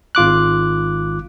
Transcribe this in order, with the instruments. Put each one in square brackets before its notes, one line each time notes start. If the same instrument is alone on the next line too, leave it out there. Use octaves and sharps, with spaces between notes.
[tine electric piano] G#1 F4 D6 F#6